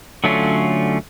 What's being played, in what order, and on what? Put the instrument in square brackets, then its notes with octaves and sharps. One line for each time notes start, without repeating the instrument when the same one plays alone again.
[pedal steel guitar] D3 F#3 A3 C#4 F4